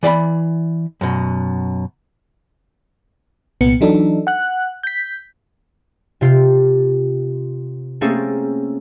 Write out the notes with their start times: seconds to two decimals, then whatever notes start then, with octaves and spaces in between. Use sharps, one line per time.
0.03 E3 D5 F5 B5
1.01 F#2 B2
3.61 C2 A#2 B3 C#7
3.81 E3 F#3 D4 D#4 A4
4.27 F#5 F#6
4.83 G6 B6
6.21 C3 F4 G5
8.01 A3 A#3 C4 C#4 G#4 A4